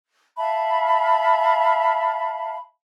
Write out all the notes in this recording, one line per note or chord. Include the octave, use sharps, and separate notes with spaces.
E5 F5 A5 B5